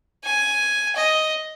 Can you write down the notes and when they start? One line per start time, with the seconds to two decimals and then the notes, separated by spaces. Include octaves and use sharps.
0.24 G#5
0.96 D#5